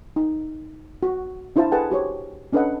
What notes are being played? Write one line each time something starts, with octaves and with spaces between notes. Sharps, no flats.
D#4
F#4
D4 E4 F4 C5 F5 A5
G#4 A4 B4 F#5 G5 A5
F#4 G4 C5 C#5
C#4 D4 A4 B4 D#5 F#5